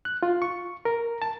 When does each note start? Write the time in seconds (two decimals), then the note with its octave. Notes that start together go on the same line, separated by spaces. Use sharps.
0.05 F#6
0.23 F4
0.42 C#6
0.85 A#4
1.22 A5